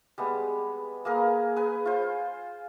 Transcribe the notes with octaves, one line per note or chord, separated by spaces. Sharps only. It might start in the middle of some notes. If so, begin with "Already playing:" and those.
G3 G#3 B3
A#3 G#4 A#4 B4
G#4 B4 G#5
F4 C5